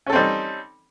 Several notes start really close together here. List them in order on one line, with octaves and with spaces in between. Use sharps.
C#4 A4 C4 G3 D#4